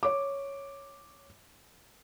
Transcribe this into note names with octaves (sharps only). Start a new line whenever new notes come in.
C#5 D6